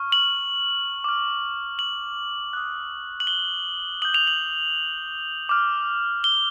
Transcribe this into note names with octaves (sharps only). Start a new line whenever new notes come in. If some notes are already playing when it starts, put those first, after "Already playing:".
Already playing: C#6 F6
F#7
D6 F6
F#7
D#6 F#6
F#7
G7
D#6 G6 F#7
F7
F#7
D6 F6
G7